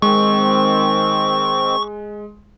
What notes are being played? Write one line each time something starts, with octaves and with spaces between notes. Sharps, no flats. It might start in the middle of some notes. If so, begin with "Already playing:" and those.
D#3 G#3 C4 C#6